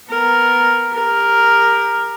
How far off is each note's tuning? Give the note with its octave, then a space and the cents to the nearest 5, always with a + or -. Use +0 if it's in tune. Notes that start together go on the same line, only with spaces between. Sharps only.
B3 +0 A#4 +0
G4 +30 A#4 +0